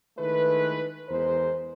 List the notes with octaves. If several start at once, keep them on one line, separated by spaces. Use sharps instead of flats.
D#3 G#3 A3 E4 B4
E2 G#3 A#4 C5